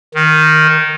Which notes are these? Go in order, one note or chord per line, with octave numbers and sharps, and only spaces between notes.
D#3